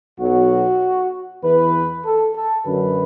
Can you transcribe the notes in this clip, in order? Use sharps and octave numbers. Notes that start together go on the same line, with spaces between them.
B1 B2 F#3 F#4
E2 E3 B4
A4
A4
F#2 D3 F#3 B4